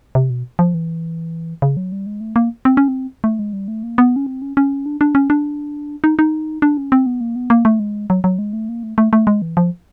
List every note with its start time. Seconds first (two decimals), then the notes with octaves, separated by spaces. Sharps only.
0.15 C3
0.30 B2
0.59 F3
0.74 E3
1.62 C#3
1.77 F#3
1.92 G3
2.06 G#3
2.21 A3
2.36 A#3
2.65 C4
2.77 C#4
2.88 C4
3.24 A3
3.39 G#3
3.53 G3
3.68 A3
3.83 A#3
3.98 B3
4.16 C#4
4.26 C4
4.42 C#4
4.57 C#4
4.86 D4
5.01 D4
5.15 C#4
5.30 D4
6.04 D#4
6.19 D#4
6.62 D4
6.77 C#4
6.92 C4
7.06 B3
7.21 A#3
7.36 B3
7.50 A#3
7.65 A3
7.79 G#3
8.10 F#3
8.24 F#3
8.39 G#3
8.53 A3
8.69 A#3
8.83 A3
8.98 A3
9.13 A3
9.27 G#3
9.42 E3
9.57 F3